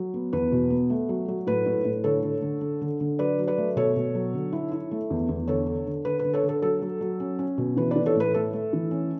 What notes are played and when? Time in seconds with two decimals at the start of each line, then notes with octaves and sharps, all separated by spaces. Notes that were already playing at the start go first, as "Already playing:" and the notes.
Already playing: F#3
0.14 B3
0.33 E2 B4
0.52 B2
0.70 B3
0.90 A3
1.09 F#3
1.28 F#3
1.47 A2 B4
1.66 A2
1.85 A2
2.04 D3 A4 C#5
2.23 D3
2.42 D3
2.61 D3
2.81 D3
3.01 D3
3.19 F#3 B4 D5
3.38 F#3
3.47 B4 D5
3.58 A3
3.76 B2 A4 C#5
3.96 B2
4.15 F#3
4.33 D3
4.53 E4
4.72 E4
4.91 A3
5.10 E2
5.29 E2
5.48 D3 A4 C#5
5.67 D3
5.87 D3
6.05 D3 B4
6.19 B4
6.24 D3
6.33 A4 C#5
6.43 D3
6.49 A4
6.62 F#3 A4
6.82 F#3
7.01 F#3
7.20 C#4
7.39 C#4
7.58 B2
7.77 E3 B4
7.91 E3 B4 D5
8.06 A4 C#5
8.15 A2 B4
8.34 A3 A4
8.53 A3
8.73 E3
8.91 C#4